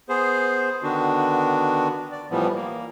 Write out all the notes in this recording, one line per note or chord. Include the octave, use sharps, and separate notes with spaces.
B3 G#4 C5
D3 D#3 B3 D4 F#4
D5
A2 E3 F3 G3 B3
A#3